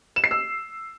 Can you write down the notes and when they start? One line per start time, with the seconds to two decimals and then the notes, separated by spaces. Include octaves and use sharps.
0.16 E7
0.24 C7
0.31 E6